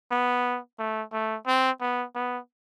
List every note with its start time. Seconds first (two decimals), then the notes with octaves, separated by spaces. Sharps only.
0.11 B3
0.79 A3
1.13 A3
1.47 C4
1.81 B3
2.15 B3